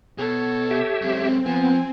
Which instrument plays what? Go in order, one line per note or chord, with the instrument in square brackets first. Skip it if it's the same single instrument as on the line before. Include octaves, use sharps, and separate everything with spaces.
[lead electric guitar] B2 [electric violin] A4 C#5
[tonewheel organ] G4 E5
[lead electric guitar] F#2 G#3 [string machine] C4
[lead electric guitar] F3 [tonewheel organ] B3 [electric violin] G#5